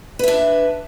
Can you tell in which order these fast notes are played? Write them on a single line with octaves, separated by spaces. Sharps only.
B4 E5 D4